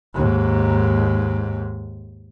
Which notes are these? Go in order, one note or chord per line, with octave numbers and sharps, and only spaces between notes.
D#2 G#2